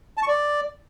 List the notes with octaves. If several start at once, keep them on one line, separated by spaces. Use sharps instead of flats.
A5
C#6
D5